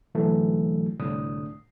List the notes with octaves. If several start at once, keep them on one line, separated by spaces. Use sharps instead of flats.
G#2 B2 D3 E3 F#3 A3
C2 A2 D3 D4 D#6